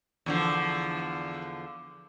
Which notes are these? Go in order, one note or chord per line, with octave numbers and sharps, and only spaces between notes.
E2 D3 F3